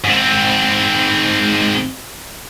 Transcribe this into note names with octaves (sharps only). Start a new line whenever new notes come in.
G#2 C4